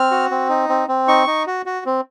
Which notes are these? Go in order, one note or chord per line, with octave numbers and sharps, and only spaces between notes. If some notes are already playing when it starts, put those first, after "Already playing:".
Already playing: C4 F6
F#4
C4
D#4
C4
C4
D#4 C#6
D#4
F#4
F#4
C4